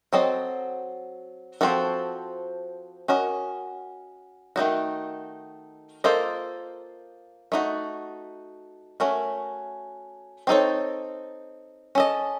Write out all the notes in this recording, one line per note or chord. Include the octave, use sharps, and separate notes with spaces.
F#3 C4 F#4 A4 D#5
F3 A3 C4 F#4 A4
C#4 F#4 A#4 D#5
D#3 A3 C4 D#4 F#4
A#3 F4 A4 C5 D#5
A3 D#4 F#4
A3 C#4 F#4 A#4
C4 D#4 A4 C#5
C#4 A4 D#5